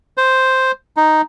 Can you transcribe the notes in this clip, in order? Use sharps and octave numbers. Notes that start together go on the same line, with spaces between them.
C5
D#4